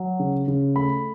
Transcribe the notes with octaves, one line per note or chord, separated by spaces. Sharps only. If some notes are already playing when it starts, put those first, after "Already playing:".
Already playing: F#3
C#3
C#3
A3 B5